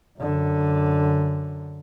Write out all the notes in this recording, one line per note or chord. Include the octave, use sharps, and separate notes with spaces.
F#2 D3